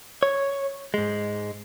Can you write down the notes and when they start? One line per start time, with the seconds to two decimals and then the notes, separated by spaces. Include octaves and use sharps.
0.23 C#5
0.94 G#2 G#3